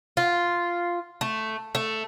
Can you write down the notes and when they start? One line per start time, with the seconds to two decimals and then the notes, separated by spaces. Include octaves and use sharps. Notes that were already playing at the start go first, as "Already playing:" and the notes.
0.17 F4
1.21 A3
1.75 A3